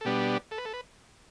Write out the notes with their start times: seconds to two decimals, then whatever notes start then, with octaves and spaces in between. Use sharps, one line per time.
0.01 A4
0.05 B2 G3 B3 D4 G4
0.51 A4
0.58 B4
0.65 A4
0.73 B4